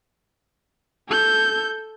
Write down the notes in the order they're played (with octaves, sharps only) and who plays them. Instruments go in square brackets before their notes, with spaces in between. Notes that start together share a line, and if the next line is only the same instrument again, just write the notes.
[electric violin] A4 G6